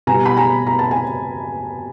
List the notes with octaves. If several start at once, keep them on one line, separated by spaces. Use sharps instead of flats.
B2 G3 B3 G#5 A#5
B5
G#5 A#5
A#5
A5
G#5